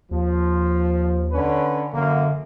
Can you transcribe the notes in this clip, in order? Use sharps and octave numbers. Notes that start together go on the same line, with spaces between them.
D#2 F3
D3 C#4 B4
F#2 D3 A#3